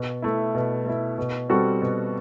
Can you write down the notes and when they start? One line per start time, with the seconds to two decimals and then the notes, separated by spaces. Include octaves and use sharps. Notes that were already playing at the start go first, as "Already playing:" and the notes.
Already playing: B2
0.22 A3 E4
0.55 B2
0.86 A3 E4
1.18 B2
1.49 G3 C4 F#4 A4
1.82 B2